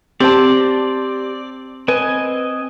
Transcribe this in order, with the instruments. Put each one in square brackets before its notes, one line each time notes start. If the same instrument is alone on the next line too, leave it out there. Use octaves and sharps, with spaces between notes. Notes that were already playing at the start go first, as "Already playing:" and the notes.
[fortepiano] C4 [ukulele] G4 A5 [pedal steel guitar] D5
[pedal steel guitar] C4 D#5 G#5 [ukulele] B4